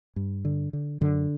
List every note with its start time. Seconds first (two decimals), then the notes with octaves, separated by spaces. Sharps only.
0.16 G2
0.45 D3
0.73 D3
1.01 F#2 D3